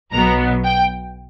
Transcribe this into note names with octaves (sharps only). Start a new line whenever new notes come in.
B1 B2 F#3 B3 A#5
G5